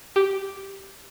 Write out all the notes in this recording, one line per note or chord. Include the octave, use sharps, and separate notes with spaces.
G4